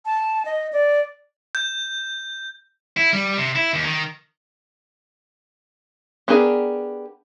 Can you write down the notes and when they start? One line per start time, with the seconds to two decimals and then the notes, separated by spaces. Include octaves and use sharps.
0.05 A5
0.45 D#5
0.73 D5
1.55 G6
2.97 E4
3.13 G3
3.38 C3
3.56 E4
3.74 D#2
3.85 D#3
6.28 B3 D4 G4 G#4 A#4